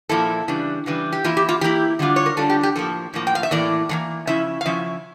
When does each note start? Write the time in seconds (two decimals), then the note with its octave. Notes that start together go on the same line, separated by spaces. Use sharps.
0.09 A#2 F3 A#3 E4 A4
0.48 C#3 E3 G3 D4
0.86 C#3 E3 G3 D4
1.13 G4
1.24 E3 A#3 E4 F4
1.37 G4
1.49 F4
1.61 E3 A#3 E4 G4
1.99 D3 G3 D4 F4
2.16 C#5
2.26 A#4
2.37 D3 G3 D4 F4 A4
2.50 G4
2.63 G4
2.76 A2 F3 A#3 A4
3.14 A2 F3 A#3
3.27 G5
3.35 F5
3.43 E5
3.51 A2 E3 A#3 D5
3.89 A2 E3 A#3
4.27 C#3 F3 C#4 E4 E5
4.61 F5
4.66 C#3 F3 C#4 E4 E5